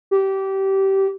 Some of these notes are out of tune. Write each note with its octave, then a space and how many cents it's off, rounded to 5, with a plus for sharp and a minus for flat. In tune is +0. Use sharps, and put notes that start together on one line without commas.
G4 -20